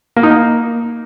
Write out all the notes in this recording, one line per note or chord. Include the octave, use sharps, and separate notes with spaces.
A#3
D#4
A#3